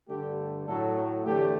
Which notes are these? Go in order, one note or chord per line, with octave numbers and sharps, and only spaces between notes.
G2 D3 A3 G4
A2 F#3 A3 A4
E2 D3 A3 G4